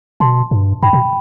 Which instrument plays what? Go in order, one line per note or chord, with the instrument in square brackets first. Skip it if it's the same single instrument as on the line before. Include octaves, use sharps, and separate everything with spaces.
[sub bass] B2 [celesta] A5 C6
[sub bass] G2
[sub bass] G2 [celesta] G5 B5
[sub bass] B2